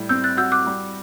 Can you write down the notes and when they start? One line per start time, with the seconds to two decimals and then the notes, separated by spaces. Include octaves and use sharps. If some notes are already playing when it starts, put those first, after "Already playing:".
Already playing: A2 G3
0.09 C4 E6 G6
0.24 F#6 A6
0.37 F#4 E6 G6
0.52 D6 F#6
0.67 G3